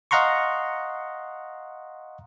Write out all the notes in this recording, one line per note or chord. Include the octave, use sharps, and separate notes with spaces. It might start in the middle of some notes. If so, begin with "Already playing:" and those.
D#5 F5 F#5 A#5 C6 C#6